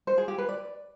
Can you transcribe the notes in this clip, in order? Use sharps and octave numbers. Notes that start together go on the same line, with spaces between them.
C5
G#4
G4
B4
D5